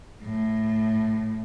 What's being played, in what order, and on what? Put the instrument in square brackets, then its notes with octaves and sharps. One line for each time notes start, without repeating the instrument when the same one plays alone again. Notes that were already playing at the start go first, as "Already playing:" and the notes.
[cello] A2